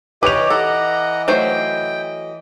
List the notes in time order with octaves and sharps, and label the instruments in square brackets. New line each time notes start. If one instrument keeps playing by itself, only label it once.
[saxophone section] E3 D#5 [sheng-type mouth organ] G4 C#5 [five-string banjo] B4 [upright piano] D6 F7
[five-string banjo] A4 [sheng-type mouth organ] F#5 A#5
[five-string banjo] F#3 A3 C5 [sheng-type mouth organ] G5